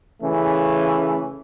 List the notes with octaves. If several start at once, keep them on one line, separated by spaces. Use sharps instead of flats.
C#3 E3 A3 C#4